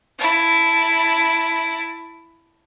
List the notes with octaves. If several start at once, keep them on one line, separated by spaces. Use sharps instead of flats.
E4 A5